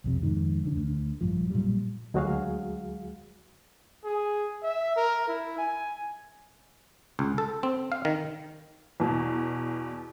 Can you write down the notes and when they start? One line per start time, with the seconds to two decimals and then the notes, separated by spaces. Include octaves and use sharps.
0.04 B1 F2 C3
0.22 F2 G#2 D#3
0.64 E2 D3 D4
0.76 D2
1.21 A#1 G2 F3
1.50 A#2 F#3 G3
2.14 D2 F#3 G#3 F#4 G#4 F5
4.04 G#4
4.63 E5
4.96 A#4
5.28 E4
5.58 G#5
7.19 C#2
7.38 A4
7.63 C4
7.92 F5
8.05 D#3
9.00 E2 B2